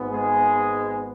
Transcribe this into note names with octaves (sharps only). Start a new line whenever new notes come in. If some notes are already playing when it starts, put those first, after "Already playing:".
Already playing: G#1 G#2 B3
G#3 G#4